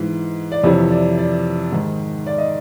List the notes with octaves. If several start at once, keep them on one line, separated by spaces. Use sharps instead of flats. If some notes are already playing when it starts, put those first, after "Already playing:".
Already playing: G#2 E3
D5
F2 C3 E3 C#5
D5
D5
G#2 D#3
D5
D#5